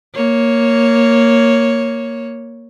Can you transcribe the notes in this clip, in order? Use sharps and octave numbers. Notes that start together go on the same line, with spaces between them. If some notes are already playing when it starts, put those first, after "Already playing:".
A#3 C#5